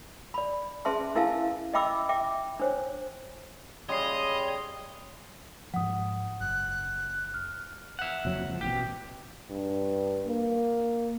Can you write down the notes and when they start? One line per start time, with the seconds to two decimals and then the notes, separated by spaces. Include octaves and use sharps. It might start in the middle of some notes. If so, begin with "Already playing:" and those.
0.34 D5 B5
0.85 C#4 G#4 B4 E5 A5 C6
1.15 D4 E4 A#4 E5 F5 A5
1.74 D#5 E5 G5 B5 D6 E6
2.09 E5 G5 D6
2.60 D4 C5 C#5
3.89 C#3 G3 C#5 D#5 C6 D#6 C7
5.74 G#2 F3 F#5 D#6
6.41 F#1 F#6
7.34 F6
7.99 E5 F#5
8.25 F#1 F2 F#3
8.46 C#2 F3
8.61 A1 B2 G4
9.50 G2
10.27 A#3